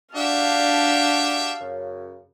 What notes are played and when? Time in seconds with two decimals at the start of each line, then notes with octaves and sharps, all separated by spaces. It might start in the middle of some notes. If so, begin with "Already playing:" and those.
0.15 D4 F#4 G4 E5 F5 A5
1.61 F#2 C#3